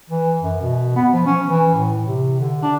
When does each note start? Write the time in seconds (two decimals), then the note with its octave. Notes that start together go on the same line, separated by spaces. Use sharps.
0.09 E3
0.41 F#2
0.61 B2
0.96 B3
1.13 F3
1.26 C#4
1.47 E3
1.74 A2
2.07 C3
2.40 D3
2.63 D4